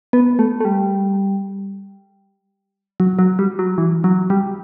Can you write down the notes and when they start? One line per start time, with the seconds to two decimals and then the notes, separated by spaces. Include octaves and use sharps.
0.13 B3
0.39 A3
0.60 A3
0.65 G3
3.00 F#3
3.19 F#3
3.39 G3
3.59 F#3
3.78 E3
4.04 F#3
4.30 G3